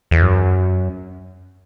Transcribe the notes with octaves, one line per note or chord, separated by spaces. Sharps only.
E2
F#2